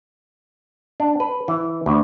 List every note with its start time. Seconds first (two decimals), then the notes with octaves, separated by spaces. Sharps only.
1.00 D4
1.20 B4
1.48 E3
1.86 D2